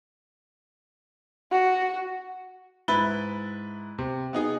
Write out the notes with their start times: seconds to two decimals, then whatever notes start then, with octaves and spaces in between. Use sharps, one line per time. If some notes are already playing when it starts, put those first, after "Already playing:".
1.51 F#4
2.88 G#2 E4 B4 B5 A6 G7
3.98 C3
4.33 B3 D#4 G#4